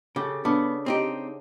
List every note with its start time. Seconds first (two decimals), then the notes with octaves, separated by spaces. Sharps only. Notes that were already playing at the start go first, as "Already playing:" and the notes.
0.16 C#3 G4 A4
0.45 C#3 B3 D4
0.86 C4 D#4 G4